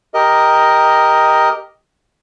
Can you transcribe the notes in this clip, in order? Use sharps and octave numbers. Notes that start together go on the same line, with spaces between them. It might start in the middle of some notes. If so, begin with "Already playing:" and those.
G4 A#4 D#5